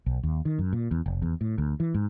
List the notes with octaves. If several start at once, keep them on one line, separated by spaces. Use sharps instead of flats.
B1
D#2
D#3
F#2
A#2
E2
F1
E2
A2
D2
E3
G#2